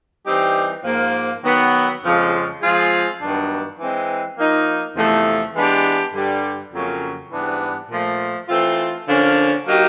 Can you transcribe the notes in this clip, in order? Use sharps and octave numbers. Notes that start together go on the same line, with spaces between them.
E3 G3 C4 D#4 G4
G#2 F3 A#3
D#3 F#3 B3
F2 C#3 F3 G#3
F3 G#3 C4 F4 G#4
G2 D#3 F#3 B3 D4
E3 G#3 C4
F3 A#3 D#4
E2 C3 F3 A3
E3 G#3 B3 D4 G4
G2 D3 G3
F2 C#3 F#3 A#3 C#4
G#2 E3 G3 B3 D4
A#2 F3 A3
E3 A3 C4 F4
D3 F3 A#3 C#4
F#3 A#3 D#4 G4